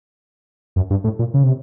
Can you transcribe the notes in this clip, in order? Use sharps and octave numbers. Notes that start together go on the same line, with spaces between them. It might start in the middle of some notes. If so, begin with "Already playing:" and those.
F#2
G2
A2
A#2
C#3
C3